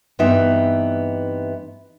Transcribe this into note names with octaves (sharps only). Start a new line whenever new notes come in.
G2 E3 B3 C4 D#4 E5